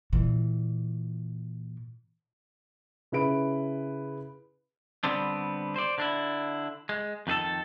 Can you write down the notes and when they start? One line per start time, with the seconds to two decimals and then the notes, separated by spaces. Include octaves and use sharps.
0.13 A#2 E3
3.12 C#3 E4 B4 D7
5.04 D3 G3 B3 C4 D4
5.76 C5 D5
5.98 D3 D4 E4
6.89 G#3
7.27 F2 D#3 G#4 A4